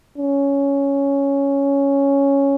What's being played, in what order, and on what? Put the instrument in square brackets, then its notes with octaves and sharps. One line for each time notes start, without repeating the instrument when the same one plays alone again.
[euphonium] C#4